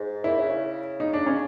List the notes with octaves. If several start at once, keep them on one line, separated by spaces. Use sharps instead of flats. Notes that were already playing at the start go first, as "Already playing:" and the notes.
Already playing: G#2
A#2 E4
C#3
C#3
D#4
D4
C#4